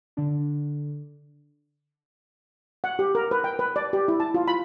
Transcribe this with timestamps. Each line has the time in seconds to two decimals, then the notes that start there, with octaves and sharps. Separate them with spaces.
0.17 D3 D4
2.84 F#5
2.99 G4
3.15 A#4
3.31 B4
3.44 G5
3.59 B4
3.76 D5
3.93 G4
4.08 E4
4.20 A5
4.34 F4
4.48 B5